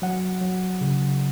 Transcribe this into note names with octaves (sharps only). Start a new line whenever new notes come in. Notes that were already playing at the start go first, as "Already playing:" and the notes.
F#3 F#5
F#3
C#3